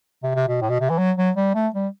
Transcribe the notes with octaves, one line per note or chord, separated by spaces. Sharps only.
C3
C3
B2
A2
B2
C3
E3
F#3
F#3
G3
A3
G3